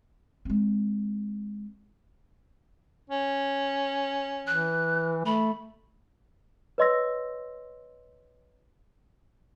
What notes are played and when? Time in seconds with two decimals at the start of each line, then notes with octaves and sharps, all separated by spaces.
0.45 G#3 C4
3.10 C#4
4.47 E3 F#6
5.26 A3 B5
6.78 B4 C#5 D#5 C6 E6 A#6